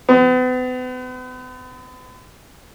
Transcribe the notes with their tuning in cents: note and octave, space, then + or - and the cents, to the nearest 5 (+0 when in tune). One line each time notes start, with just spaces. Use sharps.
B3 +40